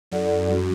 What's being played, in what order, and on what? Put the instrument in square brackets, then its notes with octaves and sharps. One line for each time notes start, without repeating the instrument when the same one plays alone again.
[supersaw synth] F#2 [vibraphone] E4 A4 D5 F#5
[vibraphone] G3 C#4 F#4